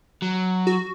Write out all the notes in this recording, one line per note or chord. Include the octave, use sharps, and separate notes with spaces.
F#3
F#4